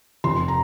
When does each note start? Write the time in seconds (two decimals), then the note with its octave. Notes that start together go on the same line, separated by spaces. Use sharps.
0.24 F1 C6
0.48 A#5